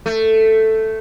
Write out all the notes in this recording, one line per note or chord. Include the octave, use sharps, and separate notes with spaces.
A3